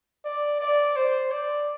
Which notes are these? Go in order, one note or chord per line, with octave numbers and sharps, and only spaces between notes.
D5
D5
C5
D5